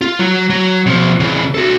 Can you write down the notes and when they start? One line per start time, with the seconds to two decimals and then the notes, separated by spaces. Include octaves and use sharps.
0.01 F4
0.19 F#3
0.50 F#3
0.86 B2 F3
1.20 C#3 E3
1.55 F#4 A4